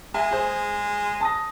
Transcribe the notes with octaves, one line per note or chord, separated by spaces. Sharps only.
G#3 E5 G#5
G#4 C5
A5 D#6 A#6